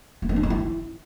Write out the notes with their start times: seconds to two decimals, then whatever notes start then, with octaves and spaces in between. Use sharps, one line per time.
0.22 A#3
0.29 C4
0.36 D4
0.43 C#4
0.50 E4